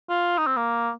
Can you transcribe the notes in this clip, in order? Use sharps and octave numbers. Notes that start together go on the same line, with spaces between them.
F4
D#4
C4
A#3